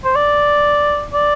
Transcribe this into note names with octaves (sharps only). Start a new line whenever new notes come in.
C5
D5
D5